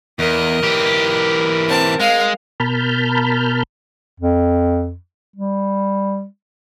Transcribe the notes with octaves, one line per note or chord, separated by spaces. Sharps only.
E2 A#4 D#5
E3 G4
C4 A5
G#3 F5
B2 A#4 A5 B5 F6 G6
F2
G3